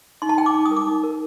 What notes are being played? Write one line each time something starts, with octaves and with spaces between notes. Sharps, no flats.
D#4 C6
A5
D#4 G5
D6
D#4
D#6
A#4
D6
D#4
A#4